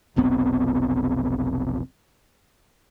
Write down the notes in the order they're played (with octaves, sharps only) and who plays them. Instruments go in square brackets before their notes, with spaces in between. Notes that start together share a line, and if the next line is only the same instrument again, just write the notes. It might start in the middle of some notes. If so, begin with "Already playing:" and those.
[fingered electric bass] F1 B1 B3 C4